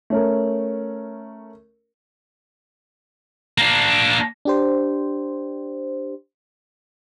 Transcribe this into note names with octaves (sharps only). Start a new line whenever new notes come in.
A3 C#4 A#4
A#3 D4
D4 G4 C5